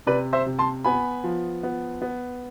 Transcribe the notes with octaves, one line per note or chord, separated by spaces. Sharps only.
C3 B4 D5
C5 E5
C3
A5 C6
B3 G#5 B5
F3
B3
B3